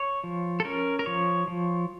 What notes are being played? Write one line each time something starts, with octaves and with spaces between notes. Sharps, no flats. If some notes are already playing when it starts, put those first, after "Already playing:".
Already playing: C#5
F3
A4
C#4 A#4
A#4
F3 C#5
F3